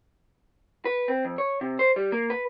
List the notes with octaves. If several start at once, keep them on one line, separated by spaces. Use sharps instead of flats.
B4
C4
F2
C#5
C3
C5
G3
A#3
B4